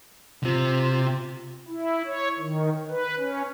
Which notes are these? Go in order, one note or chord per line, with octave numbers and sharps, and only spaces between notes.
C3 C4 F4
E4
C#5
D#3
B4
C#4